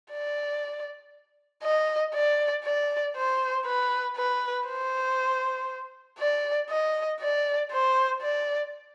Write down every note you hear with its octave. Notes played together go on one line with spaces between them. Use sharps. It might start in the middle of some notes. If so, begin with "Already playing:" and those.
D5
D#5
D5
D5
C5
B4
B4
C5
D5
D#5
D5
C5
D5